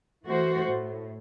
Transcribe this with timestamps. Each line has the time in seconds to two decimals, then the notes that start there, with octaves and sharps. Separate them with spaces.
0.25 E3 A3 F#4 C5
0.66 A2